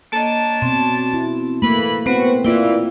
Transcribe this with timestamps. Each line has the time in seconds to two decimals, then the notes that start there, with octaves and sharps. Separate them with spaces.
0.12 A#3 D4 C#5 D#5 A5
0.62 B2 C4
1.14 E4
1.62 E3 A3 A#3 B5
2.06 B3 C4 F#4 B4 C5
2.45 E3 A#3 E4 F4 D5